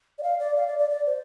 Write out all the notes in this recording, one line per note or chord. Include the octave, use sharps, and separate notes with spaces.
D5
F5
D5
F5
D5
D5
D5
C5